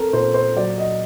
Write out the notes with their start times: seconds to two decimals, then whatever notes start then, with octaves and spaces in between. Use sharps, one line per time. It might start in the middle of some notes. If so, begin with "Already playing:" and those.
Already playing: C4 A4 A#4
0.13 A#2 C5
0.34 C5
0.56 F#3 D5
0.78 D#5